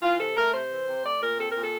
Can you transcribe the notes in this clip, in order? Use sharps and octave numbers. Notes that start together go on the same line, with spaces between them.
E3 F4
C3 A4
A3 A#4
C3 C5
E3
C3
A3 D5
A#2 A#4
C4 A4
A#2 A#4
A4